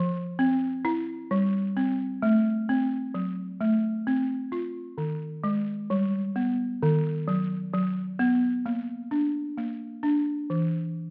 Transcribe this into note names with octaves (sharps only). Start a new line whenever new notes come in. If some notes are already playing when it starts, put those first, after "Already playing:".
Already playing: F3
C4
E4
G3
C4
A3
C4
F#3
A3
C4
F4
D#3
G#3
G3
B3
D#3
F#3
F#3
B3
A#3
D4
A#3
D4
E3